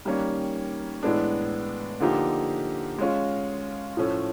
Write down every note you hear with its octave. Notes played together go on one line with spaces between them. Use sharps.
D#3 G3 A#3 C#4
A2 E3 G#3 B3 D4
D3 F3 A#3 D#4 G4
G#3 C#4 F4
A2 F3 A3 C#4